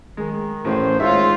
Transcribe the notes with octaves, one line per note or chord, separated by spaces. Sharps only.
D#3 G#3
A1 A2 C5
G#2 D#4 F4 C#5 E5